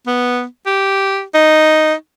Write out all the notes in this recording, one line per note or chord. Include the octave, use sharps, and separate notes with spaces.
B3
G4
D#4